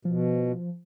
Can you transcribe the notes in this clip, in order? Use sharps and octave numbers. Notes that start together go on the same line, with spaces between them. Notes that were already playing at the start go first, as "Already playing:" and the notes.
B2 F3